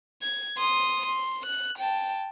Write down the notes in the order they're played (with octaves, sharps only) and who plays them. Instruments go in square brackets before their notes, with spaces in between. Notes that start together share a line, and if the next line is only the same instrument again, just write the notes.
[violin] G#6
C6 D#6
C6
F#6
G5 A5